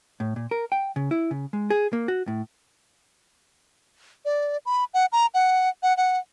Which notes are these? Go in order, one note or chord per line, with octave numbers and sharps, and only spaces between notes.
A2
A#2
A#4
G5
C#3
E4
C#3
G#3
G#4
A#3
F#4
A2
D5
B5
F#5
A#5
F#5
F#5
F#5